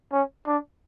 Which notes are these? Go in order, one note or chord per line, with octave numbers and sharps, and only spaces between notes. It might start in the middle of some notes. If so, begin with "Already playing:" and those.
C#4
D4